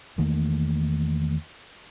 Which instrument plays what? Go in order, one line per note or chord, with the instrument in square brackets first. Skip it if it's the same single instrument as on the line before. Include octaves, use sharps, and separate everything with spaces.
[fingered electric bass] E2 D#3 A3 A#3